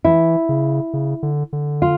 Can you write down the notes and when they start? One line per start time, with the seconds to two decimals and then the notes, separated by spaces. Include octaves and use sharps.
0.04 E3 E4
0.49 C#3
0.93 C#3
1.23 D3
1.53 D3
1.82 F4